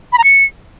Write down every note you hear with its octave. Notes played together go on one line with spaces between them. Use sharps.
B5
A#5
C#7